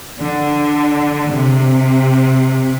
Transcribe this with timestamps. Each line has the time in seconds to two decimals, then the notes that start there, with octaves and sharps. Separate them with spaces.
0.21 D3
1.30 C3